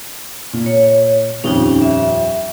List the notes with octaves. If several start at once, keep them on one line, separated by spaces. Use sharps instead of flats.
A#2
C#5
D#1 F2 C#4 D#4
E5